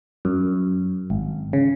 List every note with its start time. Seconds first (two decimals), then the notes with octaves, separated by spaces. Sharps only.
0.25 F#2
1.10 G#1
1.53 C#3